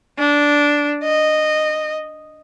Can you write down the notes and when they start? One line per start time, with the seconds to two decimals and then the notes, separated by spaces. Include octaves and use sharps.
0.19 D4
1.04 D#5